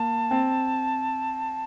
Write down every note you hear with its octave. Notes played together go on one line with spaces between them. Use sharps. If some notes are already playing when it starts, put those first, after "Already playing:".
Already playing: A#3 A5
C4